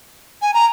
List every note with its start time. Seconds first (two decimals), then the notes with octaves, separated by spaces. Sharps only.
0.42 G#5
0.54 A#5